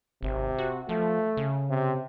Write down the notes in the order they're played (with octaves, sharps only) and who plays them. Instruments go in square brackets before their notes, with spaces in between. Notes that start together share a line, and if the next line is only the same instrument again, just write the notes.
[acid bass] G#1 [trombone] C3
[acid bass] F#4
[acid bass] F3 [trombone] A3
[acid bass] C#3
[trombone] C3